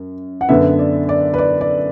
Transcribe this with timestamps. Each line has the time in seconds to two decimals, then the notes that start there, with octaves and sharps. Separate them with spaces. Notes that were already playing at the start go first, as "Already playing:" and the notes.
Already playing: F#2
0.41 F#5
0.49 F#2 D3 B3 B4 E5
0.79 D5
1.09 D5
1.34 B4
1.39 D5
1.61 D5